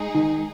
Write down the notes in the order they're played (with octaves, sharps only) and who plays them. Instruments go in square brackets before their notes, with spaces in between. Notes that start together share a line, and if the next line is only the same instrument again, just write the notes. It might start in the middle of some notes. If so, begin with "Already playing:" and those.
Already playing: [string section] G#3 D#4 G#4
[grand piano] D#3